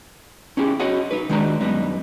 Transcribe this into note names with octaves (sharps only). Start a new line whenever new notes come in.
C#4 D#4 E4 G4 G#4
F#4 C#5 D#5 F#5
D#4 B4
D#3 G#3 D4 D#4 F#4 A#5
F#2 G3 B3 D#4